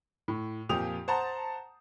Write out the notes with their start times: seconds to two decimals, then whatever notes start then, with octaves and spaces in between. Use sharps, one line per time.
0.28 A2
0.69 F2 A#2 F3 G4 D#6 F7
1.08 C5 F#5 A5 A#5